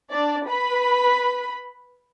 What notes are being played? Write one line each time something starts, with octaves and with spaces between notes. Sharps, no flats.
D4 D5
B4 B5